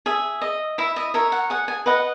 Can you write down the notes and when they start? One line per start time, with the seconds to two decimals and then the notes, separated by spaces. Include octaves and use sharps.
0.06 G#4 E5
0.41 D#5
0.78 E4 E5
0.96 D#5
1.14 A#4 C#5 E5
1.32 F#5
1.50 G#4 F#5
1.68 G#5
1.86 B4 D#5 F#5